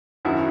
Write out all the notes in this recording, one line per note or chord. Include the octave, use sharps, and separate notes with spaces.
G#1 F#2 D#3 E4 F#4